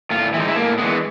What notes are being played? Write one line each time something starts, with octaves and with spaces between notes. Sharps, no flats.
A2 F4
E3 G#3 D#4 E4
E4
A2 A#3
E3 G#3 B3